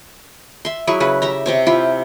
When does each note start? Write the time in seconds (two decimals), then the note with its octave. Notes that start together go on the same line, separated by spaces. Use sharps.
0.65 E5 C6
0.87 F#3 E4 G#4 C#6
1.00 C#3 C#4 B4
1.22 G4 E5 A#5
1.46 C3 C4 C#5
1.67 E4 F4 G4 G5